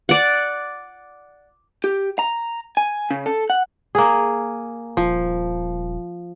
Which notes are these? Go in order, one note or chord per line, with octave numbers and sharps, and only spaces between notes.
D5 F#5
G4
A#5
G#5
C#3
A4
F#5
A#3 G#4
D#1 F3